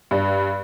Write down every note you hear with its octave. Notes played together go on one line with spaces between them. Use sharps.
G2